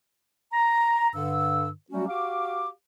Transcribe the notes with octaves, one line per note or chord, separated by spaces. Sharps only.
A#5
G2 D3 E6
F#3 G3 A3 C#4 F#4
F#4 G4 F5 D6